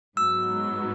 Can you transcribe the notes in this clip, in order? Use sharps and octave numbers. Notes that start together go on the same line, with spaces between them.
G#2 F#3 B3 E6